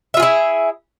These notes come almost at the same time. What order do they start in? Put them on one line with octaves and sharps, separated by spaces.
E5 F4 G#4 E4